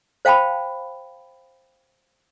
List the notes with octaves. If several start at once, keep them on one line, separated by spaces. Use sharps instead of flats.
C5 F5 G5 A5 B5